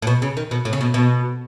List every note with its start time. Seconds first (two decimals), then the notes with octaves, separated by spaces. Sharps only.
0.02 A2
0.07 B2
0.22 C#3
0.37 D#3
0.51 B2
0.65 A2
0.73 C#3
0.81 B2
0.94 B2